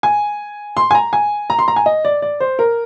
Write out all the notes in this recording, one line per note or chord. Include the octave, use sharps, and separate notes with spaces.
G#5
C6
G#5
A#5
G#5
A#5
C6
A#5
G#5
D#5
D5
D5
C5
A#4